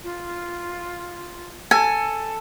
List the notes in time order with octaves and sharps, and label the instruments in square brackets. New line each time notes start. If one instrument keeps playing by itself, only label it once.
[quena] F4
[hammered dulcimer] A4 [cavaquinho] G#5